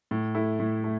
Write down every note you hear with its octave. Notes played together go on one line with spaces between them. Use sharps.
A2
A3 E4
A2
A3